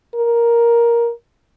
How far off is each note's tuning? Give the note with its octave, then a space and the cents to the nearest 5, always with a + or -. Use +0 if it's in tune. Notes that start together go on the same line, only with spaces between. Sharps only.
A#4 +10